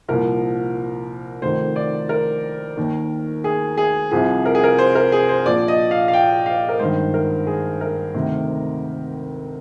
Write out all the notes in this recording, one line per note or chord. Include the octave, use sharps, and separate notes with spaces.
C2 A#2 F3 A#4
F1 F2 D#3 C5
D5
A#4
D#2 D#3
G#4
G#4
C2 C3 F3 G#4
A#4
G#4
A#4
C5
A#4
G#4
C5
A#1 A#2 F3 D5
D#5
F5
F5
G5
F5
A#4
G#1 G2 D#3 C5
A#4
G#4
A#4
D2 C3 D#3